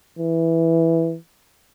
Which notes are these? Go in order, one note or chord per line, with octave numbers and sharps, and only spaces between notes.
E3